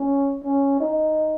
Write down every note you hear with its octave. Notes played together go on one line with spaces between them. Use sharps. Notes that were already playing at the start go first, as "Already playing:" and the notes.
Already playing: C#4
C#4
D#4